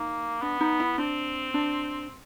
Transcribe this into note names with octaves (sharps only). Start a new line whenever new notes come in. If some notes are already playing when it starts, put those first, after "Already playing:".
Already playing: A#3 D#4
B3 D4
D#4
E4
C4 D4
D4